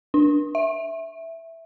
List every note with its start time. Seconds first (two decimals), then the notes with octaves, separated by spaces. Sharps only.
0.14 D4
0.55 E5